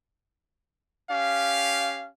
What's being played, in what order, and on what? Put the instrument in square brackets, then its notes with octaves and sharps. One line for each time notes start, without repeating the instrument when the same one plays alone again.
[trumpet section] C#4 G4 F5